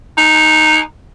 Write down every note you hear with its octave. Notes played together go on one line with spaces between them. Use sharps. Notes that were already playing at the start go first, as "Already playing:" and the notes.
D#4